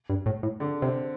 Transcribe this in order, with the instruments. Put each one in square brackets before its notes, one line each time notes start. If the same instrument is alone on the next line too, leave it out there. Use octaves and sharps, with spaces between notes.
[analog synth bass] G2
A2
A2
[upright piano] D3
[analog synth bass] C3 [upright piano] C4